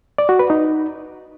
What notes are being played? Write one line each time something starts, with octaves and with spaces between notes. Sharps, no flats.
D5
F#4
B4
D#4